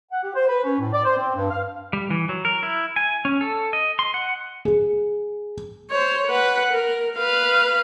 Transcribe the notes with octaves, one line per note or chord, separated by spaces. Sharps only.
F#5
G4
C5
B4
C#4
A2
D5
C5
C4
G2
F5
G3
E3
F#3
A#4
E4
G#5
C#4
A4
D#5
C6
F#5
G#4
C5 C#5
B4 F#5
A#4
B4 F5